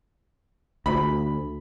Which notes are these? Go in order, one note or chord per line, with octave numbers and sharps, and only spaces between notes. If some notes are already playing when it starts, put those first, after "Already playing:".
D2 B5